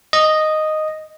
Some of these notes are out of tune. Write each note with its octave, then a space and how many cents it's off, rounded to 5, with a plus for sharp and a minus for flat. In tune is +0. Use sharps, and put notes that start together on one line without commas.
D#5 -5